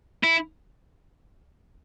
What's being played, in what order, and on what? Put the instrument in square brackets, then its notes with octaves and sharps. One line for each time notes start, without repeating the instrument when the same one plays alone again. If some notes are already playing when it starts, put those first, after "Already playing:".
[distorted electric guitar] E4